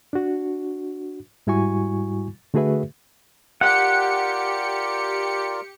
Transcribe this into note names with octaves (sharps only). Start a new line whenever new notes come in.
D4 F#4
G#2 G3 E4 F#4 G#5 C#6
D3 A3 F#4 G#4 B4 E5
F4 G4 A#4 D5 F#5 C#7